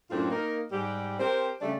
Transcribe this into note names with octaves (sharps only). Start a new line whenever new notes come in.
F#2 A2 A#3 C4 D4 F4
A#3 D#4 A#4
G#2 G3 G4
C4 G4 A#4 C5
C#3 G3 A3 D4